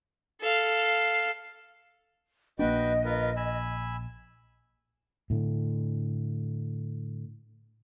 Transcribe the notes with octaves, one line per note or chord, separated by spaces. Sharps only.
A4 F5
A#1 A#3 D4 F#4 B4 D#5 G5
F4 A#4 B4
G#5 B5 E6
A2 D3